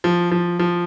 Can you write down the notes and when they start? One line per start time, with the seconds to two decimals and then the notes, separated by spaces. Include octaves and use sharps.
0.04 F3
0.31 F3
0.59 F3